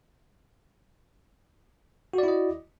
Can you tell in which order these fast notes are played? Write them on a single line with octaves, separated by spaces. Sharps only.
F#4 D5 E4 D#5